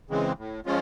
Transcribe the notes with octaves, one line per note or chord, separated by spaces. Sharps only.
C#3 E3 G#3 C4
A2
F3 G#3 C#4 F4